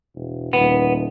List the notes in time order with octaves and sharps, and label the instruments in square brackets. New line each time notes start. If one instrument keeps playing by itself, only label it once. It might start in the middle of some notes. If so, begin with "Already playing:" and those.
[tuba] E1
[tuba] D#1 [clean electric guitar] B3